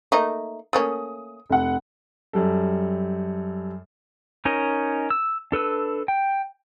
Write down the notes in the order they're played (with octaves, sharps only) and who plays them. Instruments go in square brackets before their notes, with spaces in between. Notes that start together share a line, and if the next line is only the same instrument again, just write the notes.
[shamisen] A3 A#3 D#4
[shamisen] A3 A#3 C#4 [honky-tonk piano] D#6
[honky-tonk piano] F1 F#5
[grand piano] F#2 G3 A4
[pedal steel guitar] C#4 D#4 A#4 C#5 D#5
E6
D4 A4 B4 E6
G5